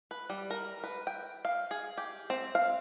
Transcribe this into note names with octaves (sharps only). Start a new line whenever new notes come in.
B4
G3
A#4
B4
G5
F5
G#4
G4
C4
F5